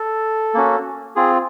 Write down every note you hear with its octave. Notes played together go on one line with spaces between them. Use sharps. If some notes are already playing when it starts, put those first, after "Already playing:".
Already playing: A4
A#3 C#4 F#4
C4 F4 G#4